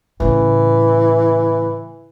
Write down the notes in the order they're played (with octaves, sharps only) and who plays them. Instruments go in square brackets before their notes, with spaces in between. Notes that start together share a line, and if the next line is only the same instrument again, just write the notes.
[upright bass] A2 C#3 [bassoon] E3